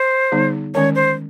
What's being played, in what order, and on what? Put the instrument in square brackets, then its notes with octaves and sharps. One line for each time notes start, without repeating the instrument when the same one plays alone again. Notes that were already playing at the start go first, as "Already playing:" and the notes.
Already playing: [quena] C5
[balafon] D3 G3 B3 D#4
[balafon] D#3 G#3 C#4 [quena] C#5
[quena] C5